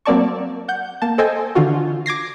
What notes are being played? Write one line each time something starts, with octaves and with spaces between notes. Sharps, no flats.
F#3 A#3 C4 D5 A5 C#6
F#5 G6
A#3 A5
A4 C5 D#5 G5 G#5
D3 E3 F4 F#4
D6 G#6 A#6 C7